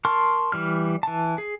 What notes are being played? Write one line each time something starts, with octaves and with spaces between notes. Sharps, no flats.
A#4 A5 C6 C#6 F6
E3 G3 F6
E3 A5
G#4